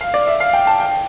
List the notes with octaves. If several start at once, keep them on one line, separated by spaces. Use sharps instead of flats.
F5
D5
E5
F5
G5
A5
G5